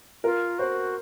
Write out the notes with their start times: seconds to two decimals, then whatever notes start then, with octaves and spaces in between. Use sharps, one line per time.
0.24 F4 A#4
0.59 F#4 C5